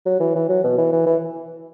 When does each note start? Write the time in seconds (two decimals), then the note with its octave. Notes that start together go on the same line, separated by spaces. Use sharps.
0.06 F#3
0.20 E3
0.35 E3
0.49 F#3
0.64 B2
0.78 E3
0.92 E3
1.06 E3